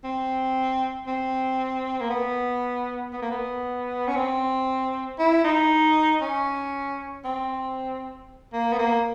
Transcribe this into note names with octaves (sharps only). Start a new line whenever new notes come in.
C4
C4
A#3
B3
B3
A#3
B3
C#4
C4
E4
D#4
C#4
C4
A#3
B3
A#3